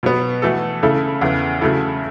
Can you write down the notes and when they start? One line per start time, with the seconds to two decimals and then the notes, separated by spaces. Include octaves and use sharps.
0.03 B2 F#3 B3
0.42 E3 A3 F#4 A4
0.83 C#3 A3 E4 A4
1.21 E2 C#3 E3
1.61 C#3 F#3 A3 E4 A4